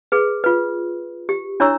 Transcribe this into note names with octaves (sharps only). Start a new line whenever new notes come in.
G#4 B4
F4 B4
G4
D4 E4 C#5 A#5 C#6 E6